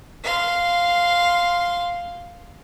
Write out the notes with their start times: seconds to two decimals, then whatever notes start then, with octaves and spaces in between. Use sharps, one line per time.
0.23 F5 C6